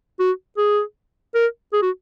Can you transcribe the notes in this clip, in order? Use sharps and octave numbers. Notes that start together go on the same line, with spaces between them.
F#4
G#4
A#4
G#4
F#4